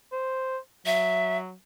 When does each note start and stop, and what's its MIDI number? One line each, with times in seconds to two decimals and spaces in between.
0.12 0.58 72
0.86 1.53 54
0.86 1.37 76